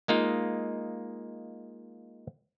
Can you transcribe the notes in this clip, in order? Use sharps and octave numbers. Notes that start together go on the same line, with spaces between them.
G#3 A#3 D#4 F4